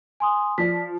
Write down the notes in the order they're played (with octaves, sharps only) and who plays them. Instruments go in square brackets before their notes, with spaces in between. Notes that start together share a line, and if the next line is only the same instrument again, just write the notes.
[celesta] G#5 C6 D#6
[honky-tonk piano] F3 [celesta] D5 B6